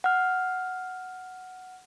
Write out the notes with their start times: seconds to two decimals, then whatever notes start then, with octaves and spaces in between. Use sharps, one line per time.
0.04 F#5 F6